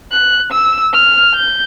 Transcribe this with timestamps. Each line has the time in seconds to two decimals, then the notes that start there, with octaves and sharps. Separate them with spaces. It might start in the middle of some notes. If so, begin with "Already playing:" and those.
0.12 F#6
0.52 E6
0.94 F6
1.35 G6